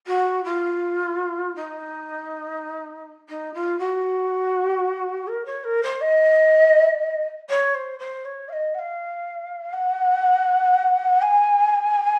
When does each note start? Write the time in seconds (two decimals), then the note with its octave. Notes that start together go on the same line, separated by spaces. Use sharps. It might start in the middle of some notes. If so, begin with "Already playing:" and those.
0.07 F#4
0.44 F4
1.55 D#4
3.28 D#4
3.54 F4
3.78 F#4
5.27 A#4
5.45 C#5
5.64 A#4
5.83 C5
6.01 D#5
7.49 C#5
7.74 C5
7.99 C5
8.25 C#5
8.48 F5
8.52 D#5
8.74 F#5
8.78 F5
9.73 F#5
11.21 G#5